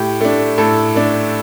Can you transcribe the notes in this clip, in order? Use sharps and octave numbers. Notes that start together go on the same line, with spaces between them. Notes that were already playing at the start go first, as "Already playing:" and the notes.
Already playing: A2 G4
A3 D4
A2 A4
A3 D4